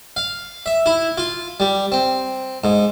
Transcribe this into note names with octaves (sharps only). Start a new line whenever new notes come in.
F5
E5
E4
F4
G3
C4
G#2